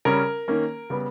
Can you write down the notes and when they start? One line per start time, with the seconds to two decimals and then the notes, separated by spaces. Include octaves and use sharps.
0.05 C#3 G3 C#4 A#4
0.48 D#3 A#3 C#4
0.90 C#3 G3 B3